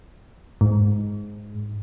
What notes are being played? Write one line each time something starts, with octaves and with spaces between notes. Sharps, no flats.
G#2